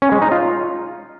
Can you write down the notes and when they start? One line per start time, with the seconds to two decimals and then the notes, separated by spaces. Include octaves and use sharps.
0.02 C#4
0.12 G#3
0.22 D#4
0.32 F4